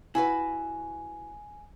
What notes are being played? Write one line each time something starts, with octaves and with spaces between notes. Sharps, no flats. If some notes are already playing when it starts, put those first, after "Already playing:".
E4 F#4 B4 G#5